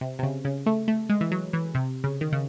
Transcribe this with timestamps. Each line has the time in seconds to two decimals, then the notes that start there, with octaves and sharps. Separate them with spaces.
0.01 C3
0.19 C3
0.23 C#3
0.45 C#3
0.66 A3
0.88 A3
1.09 G#3
1.21 E3
1.31 F#3
1.53 E3
1.75 C3
2.04 C#3
2.21 D#3
2.32 C#3